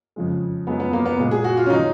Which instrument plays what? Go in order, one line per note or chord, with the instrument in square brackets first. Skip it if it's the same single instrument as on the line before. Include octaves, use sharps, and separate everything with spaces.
[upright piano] F2 C#3 F3 G#3
F#2 F3 G#3 B3
B3
A#3
B3
A#2 G#3
G#4
F#4
F4
C#4
D#3 F#3 D#4